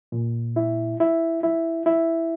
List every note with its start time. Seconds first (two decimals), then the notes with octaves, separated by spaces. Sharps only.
0.12 A#2
0.56 E4
1.00 E4
1.43 E4
1.86 E4